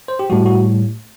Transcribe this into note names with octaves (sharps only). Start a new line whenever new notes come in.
C5
G4
A2 G3 F#4
F#4